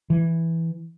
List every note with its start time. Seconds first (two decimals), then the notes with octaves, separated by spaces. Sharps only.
0.10 E3